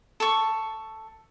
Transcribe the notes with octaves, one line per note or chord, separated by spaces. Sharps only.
A4 C#6